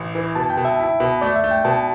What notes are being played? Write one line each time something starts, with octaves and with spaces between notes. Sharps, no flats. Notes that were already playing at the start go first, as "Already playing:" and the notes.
Already playing: A1
E3
B2 A5
G5
B2
E5
E4
B2
A3 D5
E5
A3
G5
B2 A5